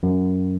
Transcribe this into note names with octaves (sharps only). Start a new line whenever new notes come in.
F#2